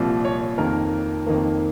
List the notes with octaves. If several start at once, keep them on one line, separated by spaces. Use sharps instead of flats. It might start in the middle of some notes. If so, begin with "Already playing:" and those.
Already playing: C2 A#2 F3
C#5
F2 D#3 A#3 A#4
F2 D#3 A#3